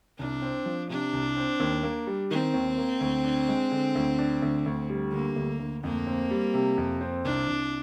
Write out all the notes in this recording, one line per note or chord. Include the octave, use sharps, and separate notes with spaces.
C2 D4
C4
F3
C3 D4
C2
C4
D#2
A#3
G3
D#3 C4
D#2
A#3
D2
D4
G#3
D3
D2
D4
D2
D2
G3
D3 A#3
D2
D2
F2 A#3
C4
G3
C3
F2
C4
C2 D4
C2